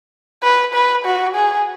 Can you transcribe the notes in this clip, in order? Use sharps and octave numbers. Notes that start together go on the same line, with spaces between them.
B4
B4
F#4
G#4